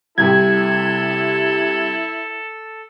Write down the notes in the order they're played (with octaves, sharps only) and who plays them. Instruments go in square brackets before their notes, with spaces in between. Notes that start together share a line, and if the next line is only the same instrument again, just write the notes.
[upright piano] C2 C3 G4 [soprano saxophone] E4 [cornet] A4 [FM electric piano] G#6